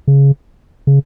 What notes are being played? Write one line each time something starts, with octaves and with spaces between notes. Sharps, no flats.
C#3
C#3